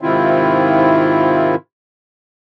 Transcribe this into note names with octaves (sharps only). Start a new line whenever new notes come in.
G#2 C3 D#3 C4 E4 F4